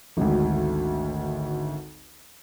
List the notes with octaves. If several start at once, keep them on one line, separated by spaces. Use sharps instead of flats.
G#1 D2